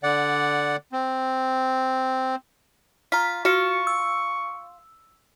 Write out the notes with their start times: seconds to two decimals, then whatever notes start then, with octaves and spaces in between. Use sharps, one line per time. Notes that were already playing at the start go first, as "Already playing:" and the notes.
0.03 D3 D5 F#5
0.92 C4
3.12 F4 A#5 B6
3.45 F4 F#4 C#6 C#7
3.87 E6